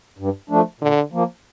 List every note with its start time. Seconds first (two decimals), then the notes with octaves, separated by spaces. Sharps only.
0.18 G2
0.50 F3 A3 D4
0.81 A#2 D3
1.12 F3 A#3